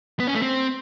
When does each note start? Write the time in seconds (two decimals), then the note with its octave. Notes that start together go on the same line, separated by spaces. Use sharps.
0.20 B3
0.27 C#4
0.35 A3
0.42 C4